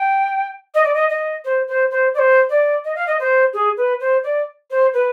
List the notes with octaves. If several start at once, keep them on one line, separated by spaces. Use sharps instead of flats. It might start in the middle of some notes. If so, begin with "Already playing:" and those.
Already playing: G5
D#5
D5
D#5
D#5
C5
C5
C5
D5
C5
D5
D#5
F5
D#5
C5
G#4
B4
C5
D5
C5
B4